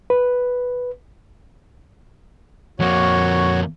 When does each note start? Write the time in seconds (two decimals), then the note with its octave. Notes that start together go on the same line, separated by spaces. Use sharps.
0.10 B4
2.80 F2 A#3 F#4 C#5